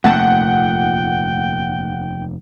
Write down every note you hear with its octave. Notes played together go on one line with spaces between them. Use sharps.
F1 D#2 A#2 A3 F#5 G5 A5